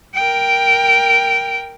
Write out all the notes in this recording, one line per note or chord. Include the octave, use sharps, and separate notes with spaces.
A#4 G5